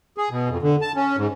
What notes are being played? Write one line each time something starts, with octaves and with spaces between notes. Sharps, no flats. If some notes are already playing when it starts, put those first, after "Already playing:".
G#4
B2
F2
D3
A5
C#4
G#2